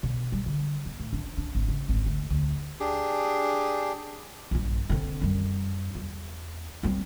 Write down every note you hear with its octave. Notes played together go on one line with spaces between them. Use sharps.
B2
G3
D3
G1
A2
D4
D4
G#1
C#3
G#1
D2
D2
D4 G4 G#4
A#1 G2
D3 C4
F#2 G3
E2
G3 C4